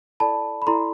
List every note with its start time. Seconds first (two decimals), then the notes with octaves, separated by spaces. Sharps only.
0.20 E4 A4 D5 A5 B5
0.62 B5
0.67 E4 A4 D5 A#5 C6